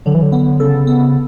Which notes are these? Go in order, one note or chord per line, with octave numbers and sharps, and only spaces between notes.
D3 F#3
E3
D3
B3
C#3 A4
B3